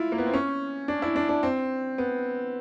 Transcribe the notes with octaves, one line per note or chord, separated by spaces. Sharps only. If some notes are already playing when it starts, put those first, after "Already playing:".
Already playing: E4 F4
A#3
B3
C4
C#4
D4
E4
D4
D4
C4
B3